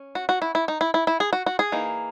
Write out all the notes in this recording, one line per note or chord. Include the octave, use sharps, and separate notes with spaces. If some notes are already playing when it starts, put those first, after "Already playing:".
Already playing: C#4
F#4
F#4
E4
E4
D#4
E4
E4
E4
G#4
F#4
F#4
G#4
E3 A#3 D#4